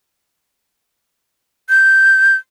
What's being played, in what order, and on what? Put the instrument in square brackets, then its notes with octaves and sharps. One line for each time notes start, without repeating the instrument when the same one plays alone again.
[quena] G6